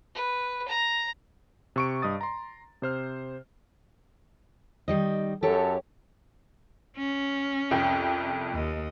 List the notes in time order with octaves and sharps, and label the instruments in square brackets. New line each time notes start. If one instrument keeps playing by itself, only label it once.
[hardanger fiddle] B4
A#5
[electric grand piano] C3 C#6 D7
G2 D#5 D#6 A6
A#5 C6
C3 C5 F6
[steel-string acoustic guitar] D#3 G3 D#5
[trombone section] F#2 A4 [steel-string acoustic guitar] G4 C#5
[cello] C#4
[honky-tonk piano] C2 F2 G5
[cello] D#2 D#5